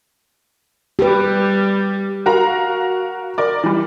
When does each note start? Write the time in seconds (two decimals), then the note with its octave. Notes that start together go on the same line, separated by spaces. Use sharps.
0.99 G3 G4 B4
2.26 F#4 A#4 F5 A#5
3.38 A#4 D5
3.63 E3 G3